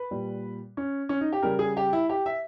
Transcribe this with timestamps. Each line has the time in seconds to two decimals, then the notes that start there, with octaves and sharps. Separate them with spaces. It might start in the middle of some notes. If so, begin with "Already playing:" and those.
Already playing: B4
0.11 A#2 G3
0.77 C#4
1.09 C#4
1.21 D#4
1.33 G4
1.42 C#3 G3 A#4
1.59 G#4
1.77 G4
1.93 E4
2.09 G4
2.26 E5